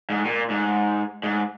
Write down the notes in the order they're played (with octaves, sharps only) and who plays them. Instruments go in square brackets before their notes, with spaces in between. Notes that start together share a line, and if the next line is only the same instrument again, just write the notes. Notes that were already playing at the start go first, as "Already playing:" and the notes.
[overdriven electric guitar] G#2
A#2
G#2
G#2